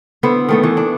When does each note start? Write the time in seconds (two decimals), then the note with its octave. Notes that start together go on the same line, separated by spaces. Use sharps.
0.23 D3 B3 E4 C5
0.49 D#3 A3 B3
0.64 E3
0.77 D4